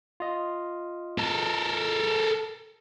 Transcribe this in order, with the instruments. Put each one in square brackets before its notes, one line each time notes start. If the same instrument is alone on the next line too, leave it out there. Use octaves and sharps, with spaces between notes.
[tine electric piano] F4 D#5
[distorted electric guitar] A4 A#4